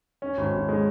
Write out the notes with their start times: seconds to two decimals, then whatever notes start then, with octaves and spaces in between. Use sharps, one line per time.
0.22 C#4
0.37 G#1
0.53 G#1
0.69 G#3